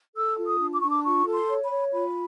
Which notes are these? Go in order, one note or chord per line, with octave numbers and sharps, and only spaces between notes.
A4 E6
F4
D#6
D4
D6
D4 C#6
D6
F4 C#6
A4
C6
C#5
B5
C#5
F4 B5